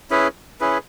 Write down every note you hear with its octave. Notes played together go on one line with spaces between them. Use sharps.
C#4 E4 G#4 B4
C#4 E4 G#4 B4